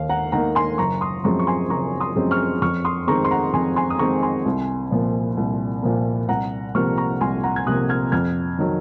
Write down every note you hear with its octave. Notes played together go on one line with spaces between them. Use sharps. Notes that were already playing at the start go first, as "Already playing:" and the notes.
Already playing: D#2 D#3 F5
F#5 A#5
D#3 A#3 F#5 A#5
G#5 C6
F#1 A#5 C#6
C6 D#6
F#2 F3 G#3 C4 A#5 C#6
C#6
G#5 C6
F#1 A#5 C#6
C6 D#6
F#2 F3 G#3 C4
C#6 F6
F2 C#6 F6
C6 D#6
D#3 G#3 C4 A#5 C#6
C6
F#5 A#5
F2 G#5 C6
G#5 C6
D#6
D#3 G#3 C4 A#5 C#6
G#5 C6
C2
A#2 F3 A#3
C2
A#2 F3 A#3
C2 F#5 A#5
C3 F3 A#3 C#6 F6
A#5 C#6
C2 G#5 C6
F#5 A#5
G#6
C3 F3 A#3 D#6 F#6
F6 G#6
F2 F6 G#6
D#3 F#3